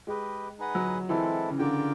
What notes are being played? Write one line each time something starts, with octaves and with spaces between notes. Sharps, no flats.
G#3 G4 B4 D#5
D#4 G#4 B4 D#5 F#5
F#3
E3 G#3 C4 E4 A4
C#3
D3 F4 A#4 D5 G5